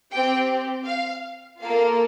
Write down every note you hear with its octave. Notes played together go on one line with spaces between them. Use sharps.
C4 G4 G5
F5
A#3 F4 A4 F5